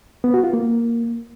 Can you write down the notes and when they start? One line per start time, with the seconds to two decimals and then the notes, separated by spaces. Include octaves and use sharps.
0.24 B3
0.34 F#4
0.44 F4
0.53 A#3